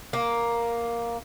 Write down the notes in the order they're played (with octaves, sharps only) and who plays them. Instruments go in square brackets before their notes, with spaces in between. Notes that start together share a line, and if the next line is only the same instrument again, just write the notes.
[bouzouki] A#3